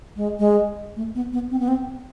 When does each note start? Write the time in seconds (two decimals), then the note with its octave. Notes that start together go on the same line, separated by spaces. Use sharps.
0.16 G#3
0.39 G#3
0.96 A3
1.15 B3
1.33 B3
1.51 C4
1.60 B3
1.68 C4